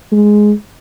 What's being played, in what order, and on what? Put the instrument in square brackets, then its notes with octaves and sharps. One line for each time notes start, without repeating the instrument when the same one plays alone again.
[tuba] G#3